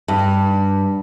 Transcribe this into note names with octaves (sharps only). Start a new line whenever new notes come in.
G2